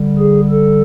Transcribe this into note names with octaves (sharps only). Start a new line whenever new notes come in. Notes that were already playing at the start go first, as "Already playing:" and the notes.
Already playing: D3 G3
G#4
A4